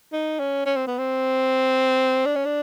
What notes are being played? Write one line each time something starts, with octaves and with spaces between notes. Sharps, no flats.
D#4
C#4
C#4
C4
B3
C4
D4
C#4
D4